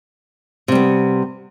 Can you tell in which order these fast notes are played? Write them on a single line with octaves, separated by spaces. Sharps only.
C3 G3 B3